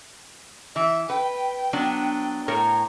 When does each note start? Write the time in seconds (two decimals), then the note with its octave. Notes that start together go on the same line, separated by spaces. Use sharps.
0.76 E3 E5
1.10 B4 G5
1.73 F#3 B3 D4
2.48 A2 A#4 C#5